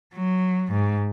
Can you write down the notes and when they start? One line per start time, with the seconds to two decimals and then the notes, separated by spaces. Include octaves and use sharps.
0.14 F#3
0.72 G#2